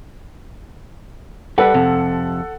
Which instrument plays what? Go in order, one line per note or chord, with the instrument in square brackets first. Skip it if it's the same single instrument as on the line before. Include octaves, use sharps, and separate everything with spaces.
[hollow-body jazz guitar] G3 B4 [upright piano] A4 F#5
[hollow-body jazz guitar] F2 C3